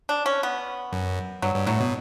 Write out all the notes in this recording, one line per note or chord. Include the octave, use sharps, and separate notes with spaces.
D4
C#4
B3
F#2
G2 F#3
G2
A2 F#3
B2